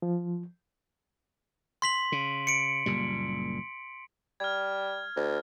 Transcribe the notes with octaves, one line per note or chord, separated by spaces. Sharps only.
F3
C6 B6 F#7
C#3
C#7 D7
F#1 A#2 G3
G3 F6 G#6
D2